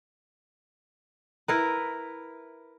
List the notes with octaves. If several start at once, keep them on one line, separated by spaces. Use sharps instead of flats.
E4 A#4 B4